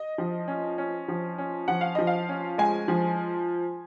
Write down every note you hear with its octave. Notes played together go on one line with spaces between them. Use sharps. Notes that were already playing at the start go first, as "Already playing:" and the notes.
Already playing: D#5
F3
C#4
C#4
F3
C#4
F3 F#5
F5
F3 D#5
F5
C#4
G#3 G#5
F3